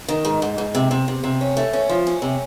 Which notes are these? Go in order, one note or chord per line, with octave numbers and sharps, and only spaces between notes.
D#3
G#2
G#2
G#2
C3
C3
C3
C3
C#4
A3
C#4
F3
C#4
C3